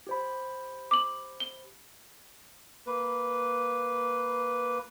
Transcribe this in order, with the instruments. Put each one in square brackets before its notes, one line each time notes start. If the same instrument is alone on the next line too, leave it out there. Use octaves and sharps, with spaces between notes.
[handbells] G4 C5 B5
[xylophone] D6 F#7
G7
[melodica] A#3 B4